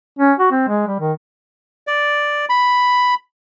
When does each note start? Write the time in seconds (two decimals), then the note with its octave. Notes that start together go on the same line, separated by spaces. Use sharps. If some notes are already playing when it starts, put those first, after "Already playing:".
0.19 C#4
0.39 F#4
0.51 C4
0.68 G#3
0.87 G3
1.00 D#3
1.87 D5
2.49 B5